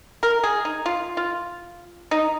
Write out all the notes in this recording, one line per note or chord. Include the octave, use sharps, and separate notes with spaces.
A#4
G#4
D#4
F4
F4
D#4